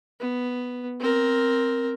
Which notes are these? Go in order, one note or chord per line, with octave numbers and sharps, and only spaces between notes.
B3
C4 A#4